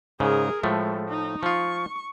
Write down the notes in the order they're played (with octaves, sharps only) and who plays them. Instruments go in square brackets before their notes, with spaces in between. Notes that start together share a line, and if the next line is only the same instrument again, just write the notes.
[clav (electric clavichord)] G#2 C#3 [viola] G#4 A#4
[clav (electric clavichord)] A2 F3 A3 [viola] G#3
[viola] D#4
[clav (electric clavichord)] F3 F4 [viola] C#6